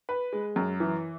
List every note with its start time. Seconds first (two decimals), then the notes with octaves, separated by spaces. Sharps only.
0.09 B4
0.32 G#3
0.56 F#2
0.80 E3